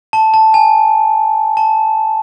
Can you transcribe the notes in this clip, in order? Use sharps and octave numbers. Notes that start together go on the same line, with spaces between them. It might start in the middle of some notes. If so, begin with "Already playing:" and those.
A5
A5
G#5
A5